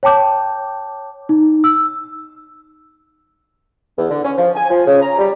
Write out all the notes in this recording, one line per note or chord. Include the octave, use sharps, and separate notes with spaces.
C#5 G5 A5 D6 G6
D#4
E6
E2
D3
C#4
F3
G#5
F3
C#3
A#5
G3